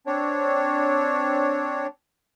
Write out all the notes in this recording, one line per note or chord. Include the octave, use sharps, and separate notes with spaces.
C4 D4 C#5